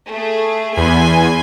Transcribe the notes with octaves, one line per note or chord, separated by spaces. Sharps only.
A3 G#4
E2 G#5 B5 C6